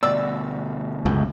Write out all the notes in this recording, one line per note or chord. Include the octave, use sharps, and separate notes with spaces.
D2 B2 D5 E6
C#2 F#2